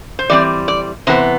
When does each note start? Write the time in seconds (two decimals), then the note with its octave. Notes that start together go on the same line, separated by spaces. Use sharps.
0.19 C5
0.30 E3 G3 C4 D5
0.68 D5
1.07 C3 E3 B3 C5